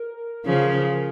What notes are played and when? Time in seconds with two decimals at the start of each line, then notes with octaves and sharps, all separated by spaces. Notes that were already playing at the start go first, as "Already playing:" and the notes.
Already playing: A#4
0.45 C#3 F3